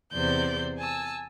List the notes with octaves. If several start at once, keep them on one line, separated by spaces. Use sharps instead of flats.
E2 C3 C5 D5 G6
G#5 A5 E6